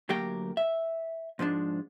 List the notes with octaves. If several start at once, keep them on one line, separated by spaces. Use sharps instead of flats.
D2 F#3 A#3 G4 A#4 G5
E5
G#2 F3 G#3 D4